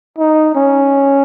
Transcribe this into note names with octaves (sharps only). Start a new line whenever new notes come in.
D#4
C#4